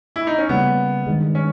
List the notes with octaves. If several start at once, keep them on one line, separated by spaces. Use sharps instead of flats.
E4
D#4
C#4
C#3 G3 A#3 B3
G2 D#3 G#3
C#4